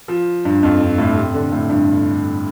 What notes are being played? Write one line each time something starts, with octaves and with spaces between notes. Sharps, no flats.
F3
G2
F2
G2
A2
C3
D3
A2
G2